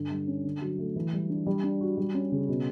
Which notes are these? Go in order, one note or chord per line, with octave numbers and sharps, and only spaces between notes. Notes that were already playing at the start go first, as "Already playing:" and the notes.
Already playing: G2 D3
G3
C#4
D3
F#3
A3
E3
G3
D4
G3
D4
F#4
G3
C#4
C#3
B2